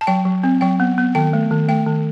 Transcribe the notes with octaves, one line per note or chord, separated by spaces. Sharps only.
A5
F#3 G5
F#3
C4
F#3 G5
B3
B3
D#3 G5
A3
D#3
A3 G5
D#3